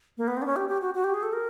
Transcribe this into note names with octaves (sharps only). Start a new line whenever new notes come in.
A#3
B3
C4
D4
C#4
G4
G4
F#4
F#4
G4
G#4
A4
A#4